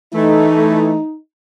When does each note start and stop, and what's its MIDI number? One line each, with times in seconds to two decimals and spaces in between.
0.14 0.99 52
0.14 0.99 57
0.14 1.16 63